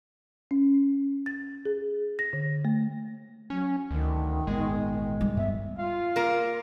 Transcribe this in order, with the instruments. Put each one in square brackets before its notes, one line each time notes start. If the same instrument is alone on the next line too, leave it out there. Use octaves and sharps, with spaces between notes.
[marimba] C#4
A6
G#4
A#6
D3
A3
[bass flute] F#3 [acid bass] C#4
[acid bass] D2 [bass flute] D#3
[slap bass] G#1 A#2 B3 [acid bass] G#3
[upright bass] G3
[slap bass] G2 B3 [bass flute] E5
[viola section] F4 [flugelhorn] F5
[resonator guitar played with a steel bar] A#3 A#4